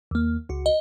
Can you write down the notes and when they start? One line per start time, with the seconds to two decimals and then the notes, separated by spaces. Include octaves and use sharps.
0.11 D#2 A#3
0.49 C#2 F#4
0.66 D#5